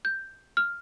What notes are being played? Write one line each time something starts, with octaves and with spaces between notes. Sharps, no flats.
G6
F6